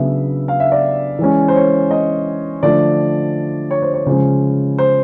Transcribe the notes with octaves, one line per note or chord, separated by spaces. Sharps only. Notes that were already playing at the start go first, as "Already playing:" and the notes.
Already playing: C#3 F#3 B3 D4 E5
F5
E5
D5
E3 G#3 C#4
C5
C#5
D#5
D3 F3 A3 D4 D5
C#5
C5
C#5
C#3 F3 G#3 C#4 C5
C5